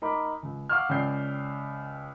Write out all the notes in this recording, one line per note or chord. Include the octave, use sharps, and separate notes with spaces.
D#4 A#4 B5 D6
C#2
F5 F#5 C#6 D6 E6 F6
C#2 C#4 D5 G5 G6 C7